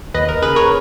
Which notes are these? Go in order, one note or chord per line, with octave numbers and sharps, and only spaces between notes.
D#2 B4 D#5
A#4
C#3 G#3 G#4 B4
A#4 C#5